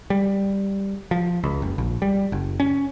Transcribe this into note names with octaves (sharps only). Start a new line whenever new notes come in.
G3
F3
C#2
F#1
A#1
G3
F#1
C#4